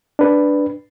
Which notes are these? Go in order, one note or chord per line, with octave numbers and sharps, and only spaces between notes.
D4 B4